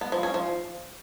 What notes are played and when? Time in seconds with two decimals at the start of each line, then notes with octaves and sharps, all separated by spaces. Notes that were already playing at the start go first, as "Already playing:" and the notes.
0.01 B3
0.12 F3
0.23 C#4
0.34 F3